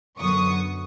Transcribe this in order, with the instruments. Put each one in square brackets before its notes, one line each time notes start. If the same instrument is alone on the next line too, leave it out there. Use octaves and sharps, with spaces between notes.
[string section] F#2 D3 F#3 B3 C#6 D#6